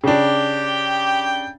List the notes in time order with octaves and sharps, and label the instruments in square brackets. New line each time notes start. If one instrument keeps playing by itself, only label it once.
[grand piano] C#3 D4 [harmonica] G4 G5